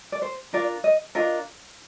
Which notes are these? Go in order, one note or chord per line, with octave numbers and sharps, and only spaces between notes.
D5
C5
D4 F4 A#4 D5
D#5
D4 F4 A#4 D#5